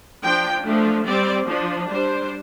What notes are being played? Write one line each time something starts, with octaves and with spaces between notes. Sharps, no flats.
F3 D4 G5
F3 A3 D4
G3 C4 D5
F3 D4
G3 D4 C5